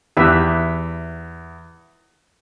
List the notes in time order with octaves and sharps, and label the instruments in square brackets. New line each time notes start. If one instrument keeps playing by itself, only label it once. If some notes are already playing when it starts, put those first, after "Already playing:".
[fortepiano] E2 [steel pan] G4 B4 E5